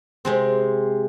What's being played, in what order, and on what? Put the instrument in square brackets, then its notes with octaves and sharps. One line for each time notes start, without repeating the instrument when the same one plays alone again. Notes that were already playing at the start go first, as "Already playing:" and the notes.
[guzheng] C3 G#3 C4